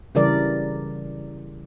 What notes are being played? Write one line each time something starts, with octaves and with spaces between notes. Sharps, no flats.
C#3 E3 G3 A#4 D5